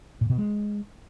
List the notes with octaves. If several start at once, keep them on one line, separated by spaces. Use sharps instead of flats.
A#2
B2
G#3